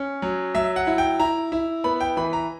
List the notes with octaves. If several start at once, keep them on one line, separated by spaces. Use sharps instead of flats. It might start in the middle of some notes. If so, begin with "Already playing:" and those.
Already playing: C#4
F#3
F#3 E5
F#5
E4
G5
E4 A#5
E4
B3 B5
G5
E3 B5
A#5